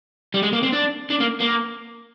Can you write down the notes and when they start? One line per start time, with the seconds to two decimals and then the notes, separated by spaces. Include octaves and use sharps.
0.34 G3
0.43 G#3
0.53 A#3
0.63 C4
0.72 D4
1.10 D4
1.20 A#3
1.40 A#3